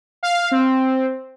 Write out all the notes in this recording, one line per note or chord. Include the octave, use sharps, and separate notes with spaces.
F5
C4